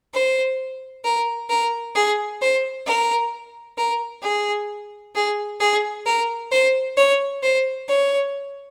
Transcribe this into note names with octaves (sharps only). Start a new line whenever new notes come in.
C5
A#4
A#4
G#4
C5
A#4
A#4
G#4
G#4
G#4
A#4
C5
C#5
C5
C#5